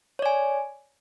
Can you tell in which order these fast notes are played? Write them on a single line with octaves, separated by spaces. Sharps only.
C#5 D5 G#5